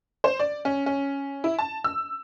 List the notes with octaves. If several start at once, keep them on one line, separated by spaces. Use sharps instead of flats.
C5
D5
C#4
C#4
E4
A5
E6